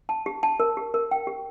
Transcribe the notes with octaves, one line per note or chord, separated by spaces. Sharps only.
A5
G4
A5
A#4
G4
A#4
G5
G4